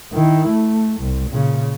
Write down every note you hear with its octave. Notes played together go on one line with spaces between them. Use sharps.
D#3 E4
A3
C2
A#2 C#3